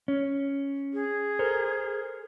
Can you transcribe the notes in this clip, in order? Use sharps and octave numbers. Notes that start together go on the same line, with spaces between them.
C#4
G#4
A4 A#4 C5